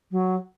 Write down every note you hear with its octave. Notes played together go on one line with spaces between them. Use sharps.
F#3